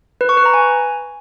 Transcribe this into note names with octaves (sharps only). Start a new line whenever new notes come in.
B4
C#6
B4
A#5
G#5